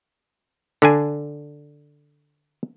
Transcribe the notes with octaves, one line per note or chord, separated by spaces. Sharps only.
D3 D4 G#5